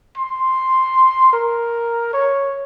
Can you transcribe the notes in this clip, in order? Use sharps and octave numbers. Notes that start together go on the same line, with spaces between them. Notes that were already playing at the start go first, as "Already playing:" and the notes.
C6
A#4
C#5